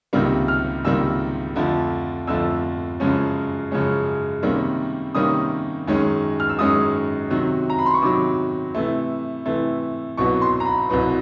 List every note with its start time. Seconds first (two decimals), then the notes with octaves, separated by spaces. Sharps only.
0.13 C#2 C3 D#3 G3 A#3
0.48 F6
0.84 C#2 C3 D#3 G3 A#3 E6
1.56 F2 D3 F3 A3
2.27 F2 D3 F3 A3 E6
3.00 F#2 C#3 F3 G#3 C#4
3.71 F#2 C#3 F3 G#3 C#4
4.43 C3 D#3 G3 A#3 C#4
5.15 C3 D#3 G3 A#3 C#4 D#6
5.87 F#2 D#3 G#3 C#4
6.40 F6
6.49 E6
6.59 F#2 D#3 G#3 C#4 D#6
7.30 C3 D#3 F#3
7.70 A#5
7.79 B5
7.86 C6
7.94 C#6
8.02 C3 D#3 F#3 D6
8.74 C3 E3 A3
9.45 C3 E3 A3
10.18 C2 B2 F#3 B3 C#6
10.42 C6
10.60 A#5
10.65 B5
10.90 C2 B2 F#3 B3